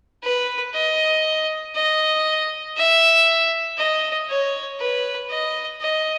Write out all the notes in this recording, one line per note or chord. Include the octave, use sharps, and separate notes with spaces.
B4
D#5
D#5
E5
D#5
C#5
B4
D#5
D#5